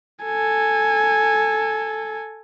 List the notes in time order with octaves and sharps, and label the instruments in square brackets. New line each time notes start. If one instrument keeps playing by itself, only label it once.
[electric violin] A4 G#5